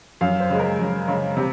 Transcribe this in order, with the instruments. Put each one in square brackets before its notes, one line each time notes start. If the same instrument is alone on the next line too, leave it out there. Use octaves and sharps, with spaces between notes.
[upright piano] F#2 F5
C5
C#3 G#3
A#4
F#2
C#3 G#3
C3